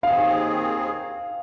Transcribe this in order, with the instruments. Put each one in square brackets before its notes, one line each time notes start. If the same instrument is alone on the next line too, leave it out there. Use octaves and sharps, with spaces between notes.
[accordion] D#2 D#3 C4 G#4 [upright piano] F5